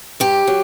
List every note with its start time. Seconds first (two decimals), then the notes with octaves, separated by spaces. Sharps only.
0.20 G2 G4
0.48 F#3